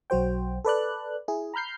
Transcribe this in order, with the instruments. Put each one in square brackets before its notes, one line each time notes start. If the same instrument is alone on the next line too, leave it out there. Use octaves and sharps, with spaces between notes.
[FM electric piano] B1 F#3 F#4 C5 G5
A4 B4 D5 F#6
E4 G#4
A#5 B5 F6 G6 C7